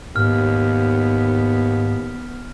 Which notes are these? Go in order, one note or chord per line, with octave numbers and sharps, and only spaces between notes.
D#2 G#2 B3 F6